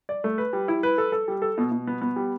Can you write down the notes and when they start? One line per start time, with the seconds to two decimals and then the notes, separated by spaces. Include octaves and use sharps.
0.09 D5
0.24 A3
0.38 B4
0.53 G3
0.68 E4
0.83 B4
0.98 A4
1.12 A4
1.28 G3
1.42 A4
1.58 B2
1.72 B2
1.87 B3
2.01 B3
2.16 G3